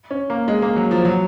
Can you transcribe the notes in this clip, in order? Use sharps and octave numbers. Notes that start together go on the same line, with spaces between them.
C#4
A#3
G#3
A#3
F#3
F3
F#3